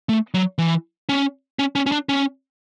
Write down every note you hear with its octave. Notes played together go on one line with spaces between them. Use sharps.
A3
F#3
E3
C#4
C#4
C#4
C#4
D4
C#4